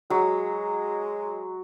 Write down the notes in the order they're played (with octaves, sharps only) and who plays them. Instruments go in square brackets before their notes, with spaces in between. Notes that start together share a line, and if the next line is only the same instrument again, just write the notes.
[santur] F#3 [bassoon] G#3